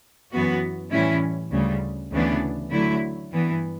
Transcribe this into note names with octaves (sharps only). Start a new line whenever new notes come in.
F#2 E3 B3 F#4
A2 E3 G3 C#4 E4
D2 C#3 G3
D2 C#3 E3 B3 D4
D3 F#3 A3 E4
G2 E3 B3